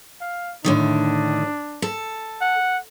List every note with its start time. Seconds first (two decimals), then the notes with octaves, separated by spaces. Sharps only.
0.21 F5
0.65 A2 D3 D#3 D4
1.82 A4
2.41 F#5